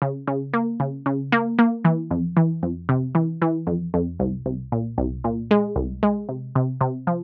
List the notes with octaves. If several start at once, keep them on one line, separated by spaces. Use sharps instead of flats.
C#3
C#3
A#3
C#3
C#3
A#3
A#3
E3
F2
E3
F2
C3
E3
E3
F2
F2
C2
C2
A#2
C2
A#2
G#3
C2
G#3
C3
C3
C3
F3